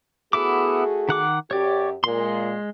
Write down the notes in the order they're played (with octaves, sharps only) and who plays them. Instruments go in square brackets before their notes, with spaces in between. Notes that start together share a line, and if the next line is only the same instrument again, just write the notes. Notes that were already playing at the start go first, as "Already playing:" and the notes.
[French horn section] A3 F#4 G#4 [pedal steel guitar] B3 E4 D6
[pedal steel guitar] D#3 F#5 D6
[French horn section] F#2 G4 [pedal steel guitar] C#5 D5
[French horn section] A#2 [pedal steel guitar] G#3 C6